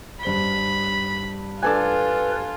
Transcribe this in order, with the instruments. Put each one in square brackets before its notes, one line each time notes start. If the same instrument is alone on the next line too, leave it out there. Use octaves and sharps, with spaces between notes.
[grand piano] G2 C5 G7 [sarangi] B5
[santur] D4 A4 G#5 [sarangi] F4 [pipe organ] B4